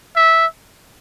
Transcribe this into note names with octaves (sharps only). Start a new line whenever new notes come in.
E5